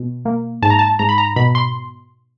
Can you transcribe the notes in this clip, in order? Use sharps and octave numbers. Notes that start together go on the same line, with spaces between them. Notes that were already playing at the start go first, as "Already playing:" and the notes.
Already playing: B2
A#3
G#2 A5
A#5
A5
G#2 A#5
B5
A#5
B2 B5
C6